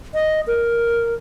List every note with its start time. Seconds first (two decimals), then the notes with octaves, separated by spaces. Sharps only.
0.14 D#5
0.47 A#4